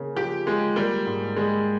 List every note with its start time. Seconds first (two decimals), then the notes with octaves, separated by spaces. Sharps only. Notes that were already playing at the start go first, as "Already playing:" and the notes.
Already playing: C#3 A#3
0.15 F3 G4
0.46 G#3 F4
0.76 G3 A#3
1.06 G#2
1.36 G3 G#3